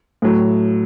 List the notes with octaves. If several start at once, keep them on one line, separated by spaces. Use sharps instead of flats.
A2 F#3